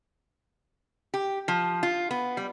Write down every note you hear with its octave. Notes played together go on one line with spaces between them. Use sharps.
G4
F3
F4
B3
G3